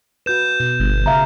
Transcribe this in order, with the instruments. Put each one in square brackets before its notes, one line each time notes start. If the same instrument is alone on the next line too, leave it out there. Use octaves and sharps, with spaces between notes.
[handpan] F#4 B4 [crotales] G6 E7
[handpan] B2
[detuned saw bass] G1
[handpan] C#3 F5 [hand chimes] E5 A#5